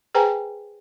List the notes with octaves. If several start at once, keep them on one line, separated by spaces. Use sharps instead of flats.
G#4 B4 C5 G5 G#5 A#5